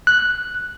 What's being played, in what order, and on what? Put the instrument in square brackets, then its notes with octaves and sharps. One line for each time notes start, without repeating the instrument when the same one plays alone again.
[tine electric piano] F#6